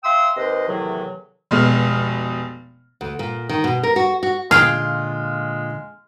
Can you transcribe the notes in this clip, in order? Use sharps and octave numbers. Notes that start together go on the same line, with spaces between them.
E5 F5 G5 C6 D#6 E6
D#2 C3 B4 C5 D#5
E2 A2 C3 D#3 F#3
F1 B2 G#3 F6
D2
A#2
D#3
B2
A#4
F#4
F#4
A#2 D3 G#3 F4 G#4 F5 G5 F6